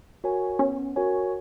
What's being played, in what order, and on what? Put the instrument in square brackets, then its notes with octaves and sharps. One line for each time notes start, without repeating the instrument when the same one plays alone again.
[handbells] F#4 A#4 C#5 G#5
[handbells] B3 [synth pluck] C#4
[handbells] F#4 A#4 C#5 G#5